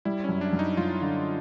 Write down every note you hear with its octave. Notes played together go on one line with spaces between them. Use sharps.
G3 E4
F#2 C#4
D4
F#2
D#4
F#2 F4
D3